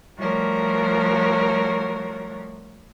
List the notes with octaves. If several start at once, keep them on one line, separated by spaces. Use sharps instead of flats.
F3 G3 A3 F#4 A#4 C#5